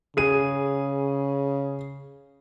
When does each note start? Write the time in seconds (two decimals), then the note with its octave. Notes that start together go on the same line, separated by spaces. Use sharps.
0.17 C#3 G#4 D#7